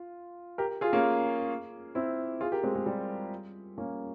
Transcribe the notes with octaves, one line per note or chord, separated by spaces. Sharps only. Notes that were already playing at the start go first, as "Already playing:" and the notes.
Already playing: F4
G4 A#4
F4 G#4
A#3 C#4
C4 E4
F4 G#4
G4 A#4
G#3 C4
G#3
G3
A#3 C#4